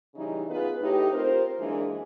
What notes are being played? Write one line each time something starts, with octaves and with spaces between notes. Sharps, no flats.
C#3 E3 G3 D#4
B3 D#4 F4 G#4 B4
A2 D#4 G4
C4 F4 A#4 C5
F#2 E3 G#3 A#3 D4